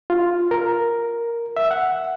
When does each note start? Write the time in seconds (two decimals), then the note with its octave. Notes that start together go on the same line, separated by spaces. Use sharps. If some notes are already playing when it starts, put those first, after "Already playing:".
0.10 F4
0.51 A#4
1.56 E5
1.71 F#5